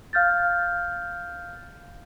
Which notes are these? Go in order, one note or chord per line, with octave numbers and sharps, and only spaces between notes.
F5 F6 G6 A6